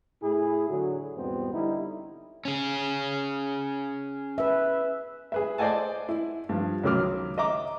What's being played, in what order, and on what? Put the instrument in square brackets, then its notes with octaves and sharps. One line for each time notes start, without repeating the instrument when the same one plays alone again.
[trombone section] A2 E4 G#4
D3 F#3
E2 G#2 B2 G3 B3 C4
D3 G3 D#4 E4
[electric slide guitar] C#4 G#4
[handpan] B4 E5
[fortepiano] G#4 B4 E5
C5 D5 D#5 F#5 G#5 A5
E4
G2 F3
C#2 D#3 F#3 D6 F6
D#5 E5 A#5 D6